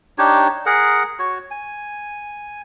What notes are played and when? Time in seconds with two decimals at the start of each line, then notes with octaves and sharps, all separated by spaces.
0.18 D4 D#4 G4 C#5
0.66 G#4 A#4 F#5
1.19 F#4 C#5
1.51 G#5